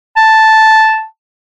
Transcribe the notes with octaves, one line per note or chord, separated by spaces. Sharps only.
A5